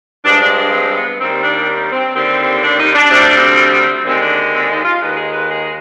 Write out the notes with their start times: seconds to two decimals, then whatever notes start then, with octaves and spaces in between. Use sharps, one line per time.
0.25 G2 F3 G#3 D4
0.41 D4
0.57 D4
0.73 C4
0.96 B3
1.20 D#2 D#3 G3 C4
1.44 D4
1.92 C4
2.15 D#2 D3 G3 C4
2.63 D4
2.79 D#4
2.95 D4
3.11 D2 C3 G3 D4
3.35 C4
4.05 D#2 D3 G#3 C4
4.22 D4
4.53 C4
4.69 D#4
4.85 F4
5.01 D#2 D#3 G#3 B4
5.17 G#4
5.33 B4
5.49 G#4